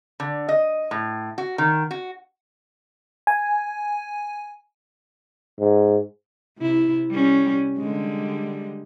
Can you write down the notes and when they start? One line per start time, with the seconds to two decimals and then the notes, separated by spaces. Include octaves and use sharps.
0.20 D3
0.49 D#5
0.91 A2
1.38 F#4
1.58 D#3
1.91 F#4
3.27 G#5
5.60 G#2
6.58 C3 E4
7.11 G3 C#4
7.78 D3 G3 G#3